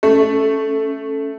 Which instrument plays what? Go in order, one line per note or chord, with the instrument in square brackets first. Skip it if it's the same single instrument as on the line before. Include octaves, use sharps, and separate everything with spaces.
[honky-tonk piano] A3 [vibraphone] C#4